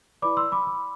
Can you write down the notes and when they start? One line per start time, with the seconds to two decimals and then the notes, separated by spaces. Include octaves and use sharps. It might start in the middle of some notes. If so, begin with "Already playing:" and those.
0.22 E4 B4 D5 B5 D6
0.37 C6 E6
0.52 B5 D6
0.67 B5 D6